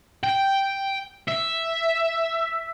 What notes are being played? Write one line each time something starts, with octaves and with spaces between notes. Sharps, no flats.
G5
E5